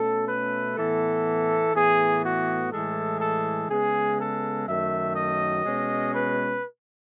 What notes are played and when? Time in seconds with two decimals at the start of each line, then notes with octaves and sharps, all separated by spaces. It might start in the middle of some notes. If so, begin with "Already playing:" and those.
Already playing: B2 A3 C#4 A4
0.28 B4
0.77 A2 E3 B3 A4
1.75 A2 E3 B3 G#4
2.24 F#4
2.71 A2 E3 G#3 A4
3.20 A4
3.69 C#3 G#3 B3 G#4
4.18 A4
4.67 F#2 D#3 F#3 A3 E5
5.16 D#5
5.64 B2 G#3 C#4
6.13 B4